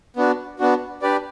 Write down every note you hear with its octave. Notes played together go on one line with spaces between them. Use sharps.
B3 D4 F#4
B3 D4 F#4
D4 G4 B4 D5